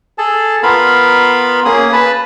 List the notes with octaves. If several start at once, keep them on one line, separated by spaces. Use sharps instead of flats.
G#4 A4 A5
B3 F4 A#4 F5 B5
A#3 C#4 G#4 D#6
B4 A5 B5